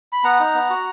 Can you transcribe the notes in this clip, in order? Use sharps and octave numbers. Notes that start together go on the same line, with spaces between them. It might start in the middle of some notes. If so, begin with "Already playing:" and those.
B5
B3 F#5 A#5
D#4
B3
F#4